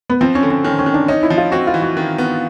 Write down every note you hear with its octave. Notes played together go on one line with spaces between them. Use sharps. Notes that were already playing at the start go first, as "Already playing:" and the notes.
B3
F3 C4
C#4
D3
C#4
D#3 C#4
C#4
D#3
D4
C#4 D#4
E4
F3
F4
C4 F#4
F4
E3
F#4
D#3
B3